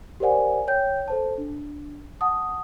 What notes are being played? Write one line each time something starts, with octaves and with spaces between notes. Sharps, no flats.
G4 A#4 C5 D5 F#5 G#5
C#5 G5 G6
A4 C5 A5
D4
F#5 A5 D#6